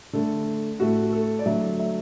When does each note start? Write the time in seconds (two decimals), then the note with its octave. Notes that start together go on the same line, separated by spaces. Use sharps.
0.13 D3 A3 A4
0.79 A2 A3 F#4
1.13 A4
1.39 D5
1.46 D3 F#3 A3 E5
1.80 E5